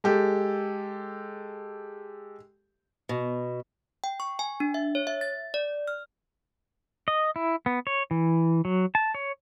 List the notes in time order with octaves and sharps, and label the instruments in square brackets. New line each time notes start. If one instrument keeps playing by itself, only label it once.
[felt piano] G#3 G4 A4
[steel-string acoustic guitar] B2
[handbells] G5
C#6
G#5
D4
E5
C#5
E5
A6
D5
F6
[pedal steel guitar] D#5
E4
B3
C#5
E3
F#3
A5
C#5